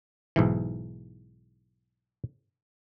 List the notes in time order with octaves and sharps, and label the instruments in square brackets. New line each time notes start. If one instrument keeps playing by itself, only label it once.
[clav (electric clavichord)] B1 G#2 E3